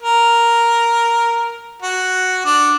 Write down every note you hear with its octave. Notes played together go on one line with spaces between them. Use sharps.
A#4
F#4
D4